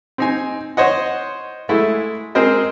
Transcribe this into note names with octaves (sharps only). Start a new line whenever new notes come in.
C4 D#4 G#5
C5 C#5 D#5 F#5
G#3 A3 E4
G#3 C4 G#4 A#4 C5 D#5